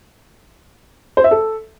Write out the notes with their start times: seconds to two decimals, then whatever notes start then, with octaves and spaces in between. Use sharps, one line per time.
1.17 C5
1.24 E5
1.31 A4